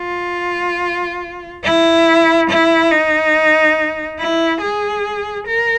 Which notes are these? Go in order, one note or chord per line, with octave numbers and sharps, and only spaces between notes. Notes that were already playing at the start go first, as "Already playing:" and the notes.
Already playing: F4
E4
E4
D#4
E4
G#4
A#4